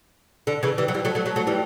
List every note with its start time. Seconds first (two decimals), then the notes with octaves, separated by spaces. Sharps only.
0.47 D3
0.63 C#3 E3
0.78 E3 G3
0.88 F#3
0.94 E3 G3
1.05 F#3 A3
1.15 F#3 A3
1.26 F#3 A3
1.36 F#3 A3
1.47 E3 G3